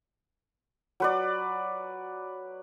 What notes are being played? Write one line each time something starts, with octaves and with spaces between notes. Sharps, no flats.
F#3 B4 D5